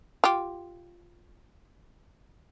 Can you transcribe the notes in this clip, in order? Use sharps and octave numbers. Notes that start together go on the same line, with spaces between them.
F4 G4